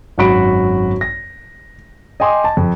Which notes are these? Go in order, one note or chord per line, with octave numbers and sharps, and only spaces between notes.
G#1 F#2 F#4 B5 D7
A#6
D#5 G5 G#5 C6 D6 D#6
A5
F2